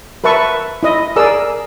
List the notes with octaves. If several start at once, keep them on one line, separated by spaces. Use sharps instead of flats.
A#4 B4 E5 A5 C#6
E4 D#5
G#4 A#4 D5 E6